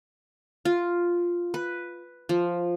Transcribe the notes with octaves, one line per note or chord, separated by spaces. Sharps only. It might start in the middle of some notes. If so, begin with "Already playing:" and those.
F4
B4
F3